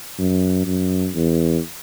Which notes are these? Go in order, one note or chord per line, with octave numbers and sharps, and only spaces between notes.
F#2
F#2
E2